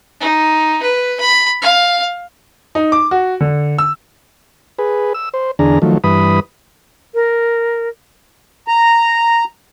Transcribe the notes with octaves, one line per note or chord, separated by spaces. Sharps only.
D#4
B4
B5
F5
D#4
D6
F#4
D3
E6
G#4 B4
E6
C5
E2 D3 D4 G#4 A#5
D#3 F3 F#3 A3
G2 E3 B4 B5 D#6
A#4
A#5